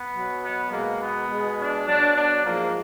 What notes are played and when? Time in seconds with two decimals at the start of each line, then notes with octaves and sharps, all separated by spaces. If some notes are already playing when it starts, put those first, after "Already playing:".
Already playing: B3
0.13 B2 F#3
0.42 B3
0.70 B2 G#3 A#3
1.00 B3
1.29 B2 G#3
1.59 D4
1.87 B2 F#3 D4
2.16 D4
2.45 G#2 F3 G#3 A#3